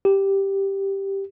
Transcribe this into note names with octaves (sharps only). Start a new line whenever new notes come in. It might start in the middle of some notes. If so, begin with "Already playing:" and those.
G4